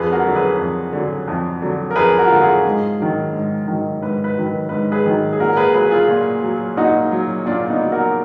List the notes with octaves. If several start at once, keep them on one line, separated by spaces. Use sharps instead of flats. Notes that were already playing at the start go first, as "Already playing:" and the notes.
Already playing: F2 G#4 B4
F#4 A#4
D3 F#3
G#4 B4
F2
D3 F#3
F2
D3 F#3
A#4
F2 G#4 B4
F#4 A#4
F4
D3 F#3 F#4
F4 G#4
G#2
D#3 F#3
G#2
D#3 F#3
G#2 B4
B4
D#3 F#3
B4
G#2 B4
G#4 B4
D#3 F#3
G#4
A#2 F#4 A#4
G#4 B4
F#3 G#4 B4
F4 G#4
A#2
F#3
A#2 D#4 F#4
F#3
A#2 D4 F4
B3 D#4
F#3
F#4 A#4